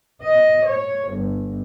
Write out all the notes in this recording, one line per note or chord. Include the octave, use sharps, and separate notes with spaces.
D#5
C#5
G1